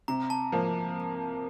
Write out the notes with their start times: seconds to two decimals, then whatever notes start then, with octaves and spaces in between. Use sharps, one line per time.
0.08 C3 A#5
0.30 A5
0.52 F3 A#3